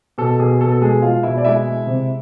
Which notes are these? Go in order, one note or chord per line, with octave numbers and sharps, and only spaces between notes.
B2 A4
B2 G#4
B2 A4
A4
G#3 G#4
G#3 F4 F5
B2 E4 E5
D5
G#3 E4 E5
G#3
C3